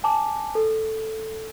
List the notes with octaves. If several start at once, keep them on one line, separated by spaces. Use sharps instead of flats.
G#5 A5 D6
A4